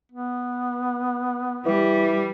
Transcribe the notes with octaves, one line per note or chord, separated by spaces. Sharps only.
B3
E3 G3